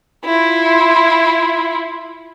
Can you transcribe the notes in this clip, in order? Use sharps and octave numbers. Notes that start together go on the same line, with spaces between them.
E4 F4